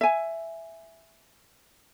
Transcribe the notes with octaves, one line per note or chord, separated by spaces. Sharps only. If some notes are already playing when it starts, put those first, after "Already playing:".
E5 G#5